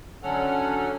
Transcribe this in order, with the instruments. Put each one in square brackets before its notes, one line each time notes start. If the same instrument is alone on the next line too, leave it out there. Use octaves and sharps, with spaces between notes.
[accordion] D3 F#3 C#4 A4 F#5 F6